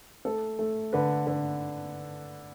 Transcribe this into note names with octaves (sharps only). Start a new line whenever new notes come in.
A3 A4
A3
D3 B4
D3